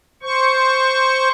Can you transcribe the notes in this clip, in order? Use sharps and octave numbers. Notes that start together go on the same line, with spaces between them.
C5 C#6